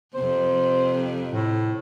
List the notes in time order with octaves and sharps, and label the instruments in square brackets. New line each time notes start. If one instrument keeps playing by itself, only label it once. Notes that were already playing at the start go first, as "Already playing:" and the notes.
[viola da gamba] F2 C3 [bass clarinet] C5
[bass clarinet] A2